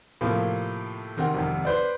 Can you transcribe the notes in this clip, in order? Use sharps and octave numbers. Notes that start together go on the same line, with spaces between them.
A2 C3 F3 A#3
C3 D#3 C4 A#4 F#5 G5
G#1 F2 C3
B4 C5 D5